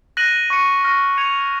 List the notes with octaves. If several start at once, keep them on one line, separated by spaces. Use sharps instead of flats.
F#6 A#6 D#7 F#7
C#6 F#6 C#7
C#6 F6 A#6
C#6 G#6 C#7 F7